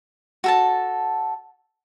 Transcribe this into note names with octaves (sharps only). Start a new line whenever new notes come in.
F#4 A4 A5